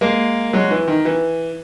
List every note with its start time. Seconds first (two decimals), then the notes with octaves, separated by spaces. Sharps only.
0.01 G#3 A#3
0.53 F#3 G#3
0.71 E3
0.88 D#3
1.05 E3